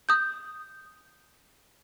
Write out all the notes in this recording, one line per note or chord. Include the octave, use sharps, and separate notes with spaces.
D#6 G6